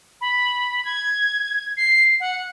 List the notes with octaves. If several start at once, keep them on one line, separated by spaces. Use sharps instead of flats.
B5
G#6
C7
F#5